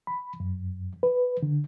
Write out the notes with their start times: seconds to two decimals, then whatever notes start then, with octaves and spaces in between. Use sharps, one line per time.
0.07 B5
0.40 F#2
1.03 B4
1.43 D3